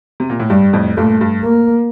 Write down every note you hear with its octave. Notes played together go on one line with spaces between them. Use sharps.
C3
A#2
A2
G2 G3
F2 A2
G2 A#2 A3
G2
A#3